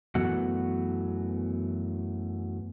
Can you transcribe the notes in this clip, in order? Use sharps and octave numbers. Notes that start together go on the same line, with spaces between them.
F#2 E3 F#3 A3 B3 F#4